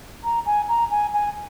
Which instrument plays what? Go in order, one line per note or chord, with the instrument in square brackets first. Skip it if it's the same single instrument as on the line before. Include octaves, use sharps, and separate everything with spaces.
[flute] A#5
G#5
A#5
G#5
G#5